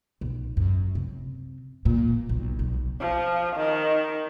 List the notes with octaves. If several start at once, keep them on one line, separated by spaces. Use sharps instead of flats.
B1
F#2
C3
A#2
B1
B1
F3
D#3